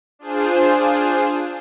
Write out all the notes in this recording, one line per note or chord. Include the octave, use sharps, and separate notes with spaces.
D4 F4 G#4 C5